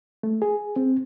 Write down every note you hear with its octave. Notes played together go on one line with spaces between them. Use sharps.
A3
G#4
C4